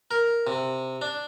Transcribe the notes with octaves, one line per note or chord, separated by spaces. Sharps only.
A#4
C3
D4